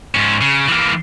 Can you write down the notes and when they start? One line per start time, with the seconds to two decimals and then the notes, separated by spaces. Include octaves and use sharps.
0.15 G#2 C#4
0.41 C#3
0.68 E3 A#3